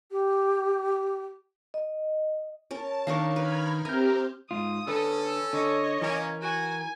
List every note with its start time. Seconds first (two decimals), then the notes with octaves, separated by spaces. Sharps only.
0.11 G4
1.74 D#5
2.71 C#4 A#4 A5
3.07 D#3 C#4 D4 A#4 F5 C#6
3.36 B4 B5 F6 G#6
3.85 C4 G4 A#4 E5 G#5 F6 G6
4.51 G#2 F4 D#6
4.88 D3 C#4 A4 B4
5.53 D3 C#5 D#5
6.02 E3 A#3 C#4 A#4
6.42 F#4 G#5